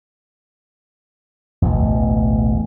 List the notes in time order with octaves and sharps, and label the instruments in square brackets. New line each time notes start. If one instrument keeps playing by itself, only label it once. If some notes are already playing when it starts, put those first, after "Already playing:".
[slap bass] E1 A1 D2